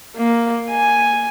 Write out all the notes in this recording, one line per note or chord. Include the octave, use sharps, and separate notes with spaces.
A#3
G#5